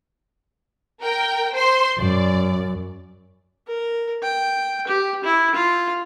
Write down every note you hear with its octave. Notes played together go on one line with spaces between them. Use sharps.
A#4 G5
C5 C6
F#2 D5
A#4
G5
G4
E4
F4